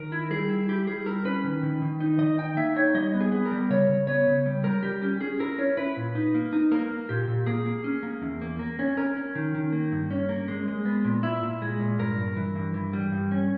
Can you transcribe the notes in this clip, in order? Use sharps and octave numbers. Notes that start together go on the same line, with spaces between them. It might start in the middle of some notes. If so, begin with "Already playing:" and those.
Already playing: D#3 A#4
E4
G3 G#4
E4
E4 G4
G3 G#4
E4 A#4
C#4 B4
D#3
D#3
D#3
D#4
D#3 D#5
D#4 G5
A#3 E5
D#4 C#5
G3 D#5
B3
G#4
B3
A#4
G3
C#3 C#5
C#3
B3 C#5
C#3
G3
G3 A#4
G3 G4
C#4 G4
C#4 G#4
E4 A#4
C#4 C#5
E4 B4
A#2
D#4
A#3
D#4
A#3 A#4
A#3
A#2 G4
A#2
A#3 G#4
A#3
C#4
A#3
E2
A#3
A#3
C#4
C#4 A#4
C#4
D#3
D#3
A#3
G2
C#4
A#3
G#3
G#3
B3
A#2
E4
A#2
G#3
A#2
G2 A#4
G2
E3
G2
E3
G3
G2
C#4